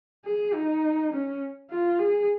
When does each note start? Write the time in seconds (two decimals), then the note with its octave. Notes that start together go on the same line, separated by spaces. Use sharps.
0.25 G#4
0.54 D#4
1.13 C#4
1.71 F4
1.99 G#4